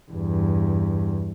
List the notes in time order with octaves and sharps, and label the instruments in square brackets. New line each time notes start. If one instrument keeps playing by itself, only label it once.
[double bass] E2 G2